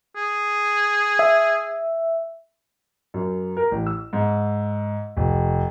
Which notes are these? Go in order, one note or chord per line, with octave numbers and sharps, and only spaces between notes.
G#4
E5
F#2
A#4
A1
E6
G#2
F1